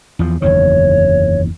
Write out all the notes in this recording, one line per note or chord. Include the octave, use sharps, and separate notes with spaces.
E2 F3
F#1 E2 D#3 C#5